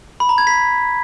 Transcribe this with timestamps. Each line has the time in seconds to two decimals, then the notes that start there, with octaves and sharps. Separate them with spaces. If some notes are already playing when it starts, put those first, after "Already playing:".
0.20 B5
0.29 A#5
0.38 G#6
0.47 B6